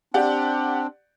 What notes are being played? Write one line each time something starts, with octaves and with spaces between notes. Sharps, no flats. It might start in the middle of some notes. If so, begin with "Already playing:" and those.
C4 D4 G4 D5 F#5